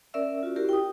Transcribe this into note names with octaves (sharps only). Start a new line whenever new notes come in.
C#4 A#4 D5 E5 E6
F4 F#4
E4 F#4 G4 A#4
G5 D#6